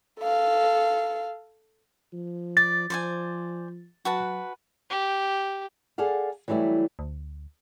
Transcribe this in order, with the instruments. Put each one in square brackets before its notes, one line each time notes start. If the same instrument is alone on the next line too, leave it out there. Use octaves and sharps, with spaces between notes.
[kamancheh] A4 F5
[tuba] F3
[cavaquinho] D5 [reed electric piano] A6
[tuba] F3 [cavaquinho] C5 D5 G#5
[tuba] F#3 [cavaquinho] F#4 B4 A5
[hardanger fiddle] G4
[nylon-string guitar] G#4 A4 D5 F5 F#5
E3 F#3 G3 A3 E4
[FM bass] D2